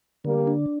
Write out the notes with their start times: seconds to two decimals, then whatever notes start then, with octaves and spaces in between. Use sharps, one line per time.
0.25 D3 G3 A#3
0.47 D4